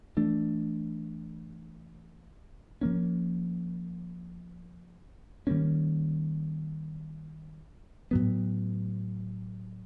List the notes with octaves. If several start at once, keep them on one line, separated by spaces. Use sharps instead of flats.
E3 A3 D4
F3 A#3 C#4
D#3 G3 A#3 C#4
A2 F#3 B3